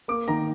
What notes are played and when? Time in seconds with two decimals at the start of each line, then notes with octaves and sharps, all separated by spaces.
0.08 A#3 D6
0.28 D#3 A#5